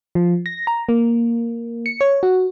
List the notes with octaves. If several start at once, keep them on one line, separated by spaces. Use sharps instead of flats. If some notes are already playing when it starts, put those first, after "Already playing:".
F3
A#6
A#5
A#3
C#7
C#5
F#4